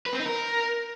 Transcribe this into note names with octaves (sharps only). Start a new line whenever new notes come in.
B4
C4
D#4
A#4